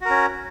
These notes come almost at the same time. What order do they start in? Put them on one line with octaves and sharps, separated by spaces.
F#4 A#4 C#4